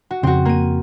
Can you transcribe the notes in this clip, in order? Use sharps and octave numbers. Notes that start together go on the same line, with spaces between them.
F#4
F2 C#3 C4 F#4
A#3 D#7